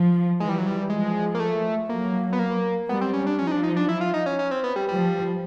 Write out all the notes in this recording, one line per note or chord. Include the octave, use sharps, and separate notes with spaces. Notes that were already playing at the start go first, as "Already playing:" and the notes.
Already playing: F3
E3 G#3
G3
F#3
G3
F3 G#3
A#3
A3
F#3 A#3
B3
A#3
G3 B3
C4
C#4
D4
F3 C#4
D#4
D4
D#4
D4
E4
F4
D#4
C#4
C#4
C4
B3
G3
F3 G3